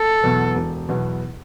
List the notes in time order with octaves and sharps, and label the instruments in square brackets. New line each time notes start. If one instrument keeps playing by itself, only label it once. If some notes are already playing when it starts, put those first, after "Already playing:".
Already playing: [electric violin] A4
[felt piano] E2 B2 F#3 B3
E1
E2 B2 F#3 B3